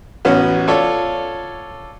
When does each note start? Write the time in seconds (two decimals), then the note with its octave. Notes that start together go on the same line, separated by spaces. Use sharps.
0.25 A1 B3 C#4 F#4
0.67 F4 A4 C#5 D5